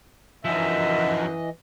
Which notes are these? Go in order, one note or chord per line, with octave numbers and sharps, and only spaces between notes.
F#2 E3 F3 D#4 D#5 E5